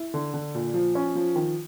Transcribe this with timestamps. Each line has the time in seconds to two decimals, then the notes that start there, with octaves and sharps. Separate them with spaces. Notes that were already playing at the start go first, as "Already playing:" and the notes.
Already playing: E4
0.14 D3
0.34 D3
0.55 A#2
0.74 F3
0.95 C#4
1.15 F3
1.36 D#3